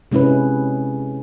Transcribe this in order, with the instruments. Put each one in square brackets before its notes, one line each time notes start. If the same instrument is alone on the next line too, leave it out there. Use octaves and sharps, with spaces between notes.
[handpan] C3 G#3 C#4 E4 B4